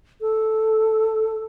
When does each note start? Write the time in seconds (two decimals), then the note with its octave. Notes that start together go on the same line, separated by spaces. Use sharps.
0.21 A4